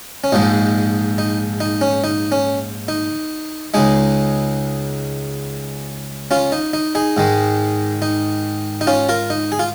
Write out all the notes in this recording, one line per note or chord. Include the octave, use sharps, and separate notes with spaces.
C#4
A#1 G#2 F3 G#3 D#4
D#4
D#4
C#4
D#4
C#4
D#4
C#2 C#3 G#3 D#4 G#4
C#4 F4
D#4
D#4
D#4 G#4
G#2 D#3 G#3
D#4
D#4
C#4 F4
F4 A#4
D#4
G#4
F4